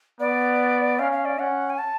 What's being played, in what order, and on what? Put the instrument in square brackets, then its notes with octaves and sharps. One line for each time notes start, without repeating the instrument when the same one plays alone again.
[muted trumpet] B3 [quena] D5
[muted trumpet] C#4 [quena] F5
[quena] F5
D5
[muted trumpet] C#4 [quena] F#5
[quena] G#5
A5